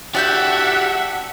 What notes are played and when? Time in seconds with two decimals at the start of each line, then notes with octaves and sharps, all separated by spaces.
0.15 D4 F#4 G4 E5 F#5 F#6 G6